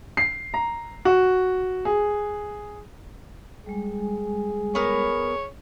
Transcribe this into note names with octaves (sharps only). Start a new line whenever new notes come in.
C7
A#5
F#4
G#4
G3 G#3 G#4
B3 A#4 C#5